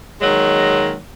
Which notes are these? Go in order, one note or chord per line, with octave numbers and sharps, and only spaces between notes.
D#3 F#3 G#3 A#3